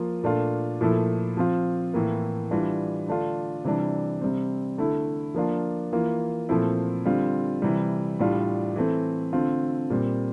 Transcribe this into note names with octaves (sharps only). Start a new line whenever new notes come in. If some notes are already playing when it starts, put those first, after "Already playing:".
Already playing: F3 A#3 F4
A#2 A3 D4 F4
A#2 F3 A3 E4
F3 C4 F4
A2 E3 A#3
E3 G3 D4 F4
D3 A3 D4 F4
C3 E3 G3 D4
C3 G3 C4
D3 A3 E4
F3 A#3 D4 F4
E3 A#3 F4
A#2 F3 A3 C4 E4
D3 G3 C4 F4
C3 E3 G3
A2 G3 D4 F4
E3 A3 C4
D3 A3 C4 F4
A#2 G3 C4